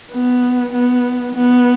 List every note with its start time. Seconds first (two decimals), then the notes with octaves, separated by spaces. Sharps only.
0.11 B3
0.73 B3
1.35 B3